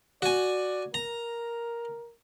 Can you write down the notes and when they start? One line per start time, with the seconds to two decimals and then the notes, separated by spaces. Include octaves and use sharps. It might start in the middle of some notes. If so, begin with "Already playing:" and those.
0.22 F#4 D5 G#5
0.94 A#4 A#5